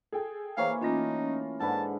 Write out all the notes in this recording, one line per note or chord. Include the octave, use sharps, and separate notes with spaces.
G#4 A4 G5
E3 A#3 C5 C#5 F5 A#5
A3 C#4 D#4 F4 A#6
G#2 D3 B4 A5